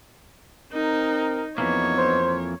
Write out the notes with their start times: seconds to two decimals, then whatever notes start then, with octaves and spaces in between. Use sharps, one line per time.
0.72 C4 D#4 A#4
1.58 F2 E3 A#3 B3 D#4 C#5
1.98 C5